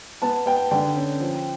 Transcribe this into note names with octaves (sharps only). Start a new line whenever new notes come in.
B3 A5
B3 G5
D3 G5
C#4
F3